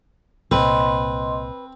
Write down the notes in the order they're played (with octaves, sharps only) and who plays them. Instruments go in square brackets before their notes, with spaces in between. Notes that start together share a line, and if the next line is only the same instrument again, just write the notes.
[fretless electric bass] C2 A#2 [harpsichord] C4 [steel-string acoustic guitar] B4 [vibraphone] D#5 C6